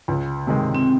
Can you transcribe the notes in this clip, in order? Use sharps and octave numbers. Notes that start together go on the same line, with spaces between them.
C#2
C3 D#3 G#3
C4